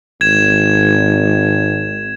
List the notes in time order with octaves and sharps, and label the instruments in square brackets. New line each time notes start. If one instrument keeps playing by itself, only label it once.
[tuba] G#1 [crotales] G#6 E7